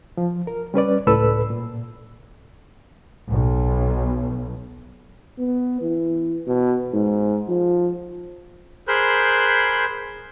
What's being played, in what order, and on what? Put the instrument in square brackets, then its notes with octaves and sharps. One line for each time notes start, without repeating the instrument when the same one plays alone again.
[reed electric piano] F3
A#4
G3 C#4 B4 D5
C#2 A2 A4 B4 B5 E6
A#2
[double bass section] B1
[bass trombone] B3
E3
B2
G#2
F3
[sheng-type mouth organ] G#4 A#4 C5 B5 F#6 G6